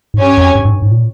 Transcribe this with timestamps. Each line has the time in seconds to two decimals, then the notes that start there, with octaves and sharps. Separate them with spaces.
0.14 G#2
0.19 G2 C#4 G4 C#5 G#5
0.38 F2
0.55 G2
0.65 G#2
0.73 G2
0.82 G#2
0.91 A#2